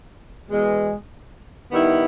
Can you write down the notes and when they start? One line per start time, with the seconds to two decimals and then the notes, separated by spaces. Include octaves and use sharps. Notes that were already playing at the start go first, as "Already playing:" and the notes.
0.50 E2 B2 G#3
1.71 D#3 G3 B3 E4